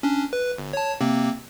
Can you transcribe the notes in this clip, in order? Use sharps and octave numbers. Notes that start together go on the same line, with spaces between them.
C#4 D4
B4
G1
C#5 A5
C3 A#3 C4